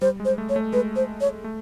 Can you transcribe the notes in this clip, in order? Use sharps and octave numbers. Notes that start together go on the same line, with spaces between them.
G3 C5
G#3
C5
A3
C#5
A3
G#3 B4
C5
C#5
A3